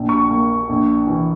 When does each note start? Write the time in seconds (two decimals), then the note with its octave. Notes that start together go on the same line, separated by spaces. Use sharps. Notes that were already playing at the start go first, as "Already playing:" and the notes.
Already playing: A#1
0.09 C#6
0.31 A#3
0.69 A#1
1.07 E3